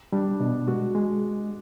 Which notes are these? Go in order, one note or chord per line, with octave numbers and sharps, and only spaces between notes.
G3 D4
B2 D4
G#3 F#4
G#3